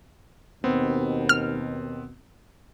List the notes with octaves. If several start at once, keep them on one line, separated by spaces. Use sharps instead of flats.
D#2 B2 B3 C4
F6